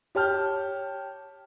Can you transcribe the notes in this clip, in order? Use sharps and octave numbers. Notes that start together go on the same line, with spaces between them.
G4 C#5 A5 F6 G6